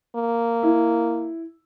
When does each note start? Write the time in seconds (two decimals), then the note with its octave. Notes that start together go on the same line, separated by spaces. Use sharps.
0.16 A#3
0.63 E4